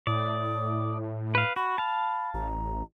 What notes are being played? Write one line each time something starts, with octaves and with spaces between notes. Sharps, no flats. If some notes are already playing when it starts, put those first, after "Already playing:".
A2 D5 D#6
B4 F5
F#4 B5
F5 A5
A1 A#5